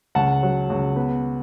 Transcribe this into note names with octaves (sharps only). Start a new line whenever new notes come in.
C#2 F#5 A5
F#3
C#2
B3